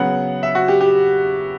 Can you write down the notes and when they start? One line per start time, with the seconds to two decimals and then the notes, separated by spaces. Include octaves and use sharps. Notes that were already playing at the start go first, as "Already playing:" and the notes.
Already playing: C#3 F#3 B3 F#5
0.43 E5
0.55 F#4
0.68 G4
0.81 G4